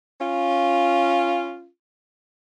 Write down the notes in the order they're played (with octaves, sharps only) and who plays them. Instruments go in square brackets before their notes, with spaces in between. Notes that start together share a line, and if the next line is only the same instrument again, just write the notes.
[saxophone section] C#4 F4